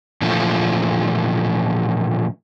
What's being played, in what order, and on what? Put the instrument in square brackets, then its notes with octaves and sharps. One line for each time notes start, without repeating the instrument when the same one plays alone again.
[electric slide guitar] A#2 D3 E3 F3 A3